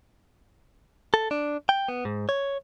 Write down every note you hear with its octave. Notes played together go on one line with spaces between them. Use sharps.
A4
D4
G5
B3
G#2
C#5